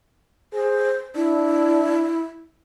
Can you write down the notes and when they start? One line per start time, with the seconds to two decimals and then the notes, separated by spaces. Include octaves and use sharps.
0.54 G#4 C5
1.16 D4 E4